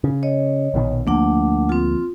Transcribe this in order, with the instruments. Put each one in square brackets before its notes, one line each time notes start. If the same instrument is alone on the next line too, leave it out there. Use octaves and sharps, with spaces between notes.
[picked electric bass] C#3
[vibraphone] C#5 D#5
[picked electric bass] A#1 B2 D#3
[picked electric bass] D2 F3 A#3 [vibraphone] A3 D4 F#5
[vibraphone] C4 F4